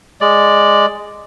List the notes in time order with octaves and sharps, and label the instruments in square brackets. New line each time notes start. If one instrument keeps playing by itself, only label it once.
[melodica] G#3 D5